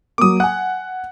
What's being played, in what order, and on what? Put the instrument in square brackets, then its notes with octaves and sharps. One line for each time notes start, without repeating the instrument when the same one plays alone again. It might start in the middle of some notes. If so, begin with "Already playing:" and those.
[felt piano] F#3 A#3 [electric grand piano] D6 D#6
[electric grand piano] F#5 [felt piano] G#5 F#6